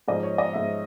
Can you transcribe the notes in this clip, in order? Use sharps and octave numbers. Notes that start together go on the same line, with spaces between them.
G#2 F3 D#5
C#5
D#5
G#2 F3 E5